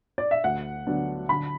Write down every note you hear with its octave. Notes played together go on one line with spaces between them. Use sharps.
D5
E5
D2 F#5
D3 F#3 B3 D4
D3 B5